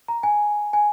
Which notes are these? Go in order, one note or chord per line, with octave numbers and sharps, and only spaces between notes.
A#5
G#5
G#5